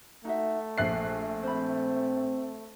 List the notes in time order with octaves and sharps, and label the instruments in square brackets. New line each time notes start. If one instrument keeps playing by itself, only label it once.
[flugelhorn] A3 [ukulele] D#4 F#4 E5
[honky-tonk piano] A#1 F#6 C7 [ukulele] E5
[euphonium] C4 [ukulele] C5 B5